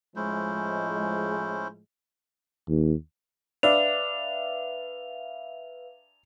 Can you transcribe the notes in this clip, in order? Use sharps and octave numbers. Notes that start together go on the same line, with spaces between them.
A2 F3 G#3 C#4 E4 C5
D#2
D4 B4 E5 F5 F7